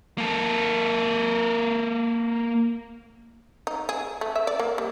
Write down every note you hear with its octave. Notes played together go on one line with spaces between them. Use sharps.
A#3 A4
D#4
G#4
A3
E5
D5
A#3
G3